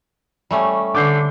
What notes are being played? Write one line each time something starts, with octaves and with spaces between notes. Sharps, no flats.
G3 A3 C#4
D3 D6 G6 C7